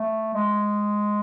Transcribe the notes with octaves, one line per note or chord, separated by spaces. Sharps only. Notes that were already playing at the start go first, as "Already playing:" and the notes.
Already playing: A3
G#3